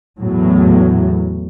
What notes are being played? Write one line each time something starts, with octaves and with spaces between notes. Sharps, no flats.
E2 A2 F#3